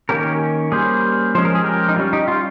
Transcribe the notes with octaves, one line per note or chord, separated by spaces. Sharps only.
D#3 A#3 C#4 G4 A#4
G3 A#3 C#4 G#4 C5
F3 G#3 C#4 C5
A#4
G#4
G4 A#4
D#4
G3 C#4 F4
D#4 G4
F4